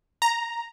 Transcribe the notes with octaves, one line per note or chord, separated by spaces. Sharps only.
A#5